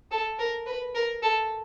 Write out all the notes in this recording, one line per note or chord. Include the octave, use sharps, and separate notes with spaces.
A4
A#4
B4
A#4
A4